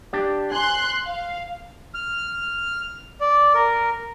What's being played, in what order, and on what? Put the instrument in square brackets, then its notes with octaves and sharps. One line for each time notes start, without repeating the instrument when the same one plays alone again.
[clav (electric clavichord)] D4 G4 D5
[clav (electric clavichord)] G#5 [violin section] C6 F#6
[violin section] F5
[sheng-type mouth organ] F6
D5
A#4